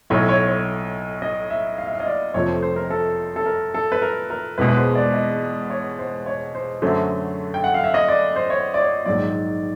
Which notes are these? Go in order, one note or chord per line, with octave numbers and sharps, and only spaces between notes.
B1 A2 F#3 C#5
C#5
C#5
D#5
E5
F5
E5
F5
D#5
D5
F1 F2 C3 F3 A3 C#5
C5
C5
A#4
A4
A4
A#4
A4
B4
A#4
A#4
E1 E2 B2 G#3 B4
B4
C5
D5
D#5
C#5
C5
C#5
C5
F#2 D3 F#3 A3 C5
G5
F#5
F5
E5
D#5
D5
C5
C#5
D5
C#5
A#1 G#2 D#3 F#3 D5